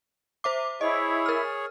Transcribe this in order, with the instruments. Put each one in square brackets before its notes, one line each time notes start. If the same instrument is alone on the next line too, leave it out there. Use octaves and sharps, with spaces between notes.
[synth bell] C5 E5 D6
[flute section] E4 [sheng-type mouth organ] G#4 C#5 [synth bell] D#5
[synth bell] A#4 F6